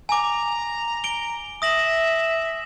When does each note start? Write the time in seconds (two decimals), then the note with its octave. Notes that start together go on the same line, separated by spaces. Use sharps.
0.09 G#5 A#5 D6
1.04 D7 G7
1.62 E5 D#6 A#6 F#7